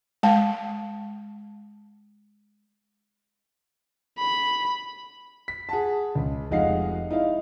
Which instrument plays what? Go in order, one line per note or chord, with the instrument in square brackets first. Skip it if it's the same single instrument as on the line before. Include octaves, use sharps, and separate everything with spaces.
[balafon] G#3 F5 A5
[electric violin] B5
[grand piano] B6
G#4 F#5 A5
C#2
F1 G#3 D#4 F5 F#5 C7
D#4 E4 F5